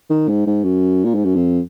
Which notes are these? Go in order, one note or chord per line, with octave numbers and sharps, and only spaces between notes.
D#3
G#2
G#2
F#2
A#2
G#2
F#2
F2